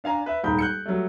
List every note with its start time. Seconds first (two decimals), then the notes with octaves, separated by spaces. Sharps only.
0.04 D4 F5 G#5 A#5
0.26 B4 E5
0.43 D#1 D#2 G#2 B5 G6
0.59 F#6 G6 C#7
0.86 F#3 G3 A3